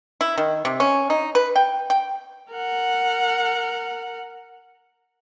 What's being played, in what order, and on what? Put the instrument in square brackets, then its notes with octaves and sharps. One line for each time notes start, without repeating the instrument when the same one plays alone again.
[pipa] E4
D#3
C3
C#4
D#4
B4
G5
G5
[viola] A#4 F#5